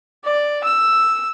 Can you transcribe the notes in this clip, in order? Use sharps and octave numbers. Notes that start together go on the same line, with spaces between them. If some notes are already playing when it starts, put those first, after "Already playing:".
D5
E6